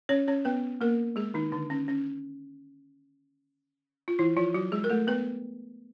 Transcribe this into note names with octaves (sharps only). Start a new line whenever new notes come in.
C#4 C#5
C#4 C#5
B3 B4
A#3 A#4
G#3 G#4
D#3 D#4
D3 D4
C#4
C#4
F4
E3 E4
F3 F4
F#3 F#4
G#3 G#4
A#4
A3 A4
B3 B4